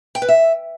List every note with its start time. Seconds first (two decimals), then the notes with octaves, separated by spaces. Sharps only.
0.15 G5
0.22 B4
0.28 E5